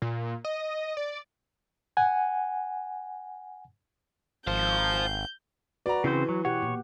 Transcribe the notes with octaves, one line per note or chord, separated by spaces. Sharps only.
A#2
D#5
D5
F#5 G#5
G#1 C5 F5 G6
F#4 B4 D5 A#5
C#3 E3 C4 C5
F#3
B2 G4 C#5 F#5
A#2